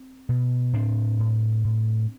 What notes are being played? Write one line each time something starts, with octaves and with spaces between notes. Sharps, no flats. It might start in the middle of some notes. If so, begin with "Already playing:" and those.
Already playing: C4
B2
A2 C4 D4
A2
A2